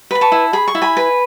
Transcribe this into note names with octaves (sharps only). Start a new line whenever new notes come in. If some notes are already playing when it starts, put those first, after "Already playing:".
B4 B5
A5 C#6
E4
G#4 B5
C#6
E4
G#5 B5
B4